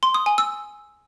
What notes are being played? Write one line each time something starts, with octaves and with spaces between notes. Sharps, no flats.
C6
D#6
G#5
E6